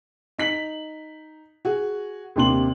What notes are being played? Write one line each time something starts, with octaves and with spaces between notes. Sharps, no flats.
D#4 B6 F#7
F#4 G#4
D#2 C3 D4 C6 F#7